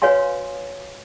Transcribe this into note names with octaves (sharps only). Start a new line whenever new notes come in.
F#4 B4 C#5 F5 G#5 C6